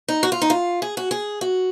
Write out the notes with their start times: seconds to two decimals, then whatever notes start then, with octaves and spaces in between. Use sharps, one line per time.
0.08 D#4
0.23 F#4
0.32 F4
0.42 D#4
0.50 F4
0.82 G#4
0.97 F#4
1.11 G#4
1.41 F#4